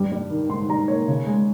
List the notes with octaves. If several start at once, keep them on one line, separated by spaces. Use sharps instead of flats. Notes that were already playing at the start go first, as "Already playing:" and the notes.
Already playing: G2 G3
G3
D#3
G#2 C6
G3 A#5
A#3 C#5
C#3
G#3